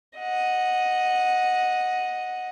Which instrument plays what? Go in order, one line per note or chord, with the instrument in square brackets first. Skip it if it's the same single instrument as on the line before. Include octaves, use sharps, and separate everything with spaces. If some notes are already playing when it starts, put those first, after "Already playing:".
[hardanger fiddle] D#5 F#5